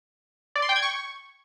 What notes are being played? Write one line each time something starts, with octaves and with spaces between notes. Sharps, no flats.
D5
C6
G5
G#6
C#6